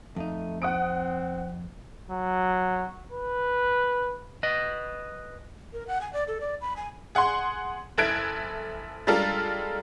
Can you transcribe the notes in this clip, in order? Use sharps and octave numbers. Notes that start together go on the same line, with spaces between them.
F2 A3 D#4
C4 F#5 D#6 D7
F#3
B4
B4 D#5
A#4
F#5
G#5
D5
A4
D5
B5
G#5
G#4 F#5 G#5 C6
F#1 E4 A4 F#6 G#6 D7
G3 G#3 D4 F4 A4 A#4